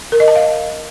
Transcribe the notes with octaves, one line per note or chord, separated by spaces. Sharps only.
A#4
D#5
A5
F5